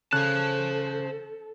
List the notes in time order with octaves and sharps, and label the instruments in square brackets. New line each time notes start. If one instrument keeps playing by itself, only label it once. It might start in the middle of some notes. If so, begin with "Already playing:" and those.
[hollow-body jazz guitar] C#3 [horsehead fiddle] A4 [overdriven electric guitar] C5 A5 [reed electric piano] F#6